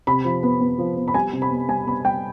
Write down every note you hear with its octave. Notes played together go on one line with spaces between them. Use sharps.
C3 B5
F3
B3
B3
F3
B3
B5
G3 G#5
C3
B5
B3
G3 G#5
B3 B5
G3 G5